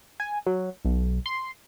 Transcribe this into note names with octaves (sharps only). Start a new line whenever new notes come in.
G#5
F#3
B1
C6